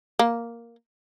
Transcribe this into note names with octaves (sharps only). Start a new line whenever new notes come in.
A#3